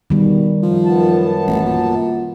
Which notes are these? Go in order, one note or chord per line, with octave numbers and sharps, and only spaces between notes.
B2 D#3 G3
F#2 F3
F#2 B3 A5
A1
A#2